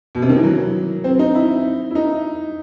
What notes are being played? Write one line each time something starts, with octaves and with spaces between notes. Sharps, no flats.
B2
C3
D#3
E3
F#3
C4
D#4
E4
E4
D#4